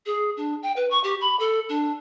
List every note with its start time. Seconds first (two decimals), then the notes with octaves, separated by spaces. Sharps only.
0.06 G#4
0.37 D4
0.63 G5
0.76 B4
0.90 C#6
1.04 G4
1.21 B5
1.39 A4
1.69 D4